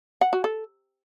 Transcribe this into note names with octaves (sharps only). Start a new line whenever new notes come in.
F#5
F#4
A4